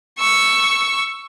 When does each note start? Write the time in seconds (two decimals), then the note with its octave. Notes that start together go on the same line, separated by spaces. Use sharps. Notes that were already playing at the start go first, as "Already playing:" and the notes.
0.18 C#6 E6